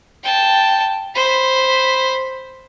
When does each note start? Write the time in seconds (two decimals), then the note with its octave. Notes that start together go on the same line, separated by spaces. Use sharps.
0.24 G5 A5
1.15 C5 B5